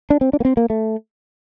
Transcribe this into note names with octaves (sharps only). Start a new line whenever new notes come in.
D4
C4
D4
A#3
C4
A#3
A3